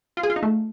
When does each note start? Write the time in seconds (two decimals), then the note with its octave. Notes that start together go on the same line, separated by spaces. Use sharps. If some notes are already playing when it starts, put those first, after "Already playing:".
0.17 F4
0.23 G#4
0.30 F4
0.36 D#4
0.43 A3